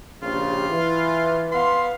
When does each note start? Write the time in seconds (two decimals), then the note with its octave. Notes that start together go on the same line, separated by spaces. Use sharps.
0.23 A#1 C#3 F4 G4
0.68 E3
1.52 B3 F5 C6